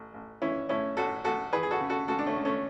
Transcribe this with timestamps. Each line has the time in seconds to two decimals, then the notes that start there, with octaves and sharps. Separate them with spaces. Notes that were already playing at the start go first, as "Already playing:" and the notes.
Already playing: A1
0.14 A1
0.42 E3 C#4 E4
0.69 A2 C#4 E4
0.97 A1 F#4 A4
1.24 A1 F#4 A4
1.52 E3 G#4 B4
1.63 G#4
1.71 F#4 A4
1.80 C#3
1.89 F#4 A4
2.08 C#2 F#4 A4
2.19 D4
2.26 A3 C#4
2.36 C#2
2.45 A3 C#4